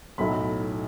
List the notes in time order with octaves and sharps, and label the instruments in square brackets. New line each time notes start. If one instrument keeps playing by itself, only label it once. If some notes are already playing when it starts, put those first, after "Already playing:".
[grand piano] B1 A2 F#3 B5